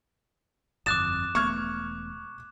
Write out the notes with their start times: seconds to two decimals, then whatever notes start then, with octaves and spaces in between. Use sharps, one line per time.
0.86 G1 F2 D6 D#6 F#6 A6 E7
1.35 E1 A3 B3 C#6 F6 G#6